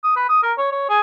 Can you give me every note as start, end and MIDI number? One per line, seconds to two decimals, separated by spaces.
0.04 0.12 87
0.16 0.25 71
0.29 0.41 87
0.43 0.52 70
0.58 0.69 73
0.72 0.88 73
0.89 1.01 68